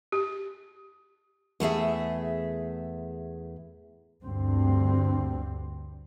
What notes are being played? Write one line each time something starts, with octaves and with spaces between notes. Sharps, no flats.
G4
E2 A3 G#4 E5
D2 G2 D3 C4